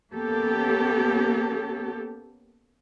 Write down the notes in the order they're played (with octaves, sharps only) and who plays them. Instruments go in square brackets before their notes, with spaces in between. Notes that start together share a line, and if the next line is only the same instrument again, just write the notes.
[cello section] A#3 B3 C#4 G4 A4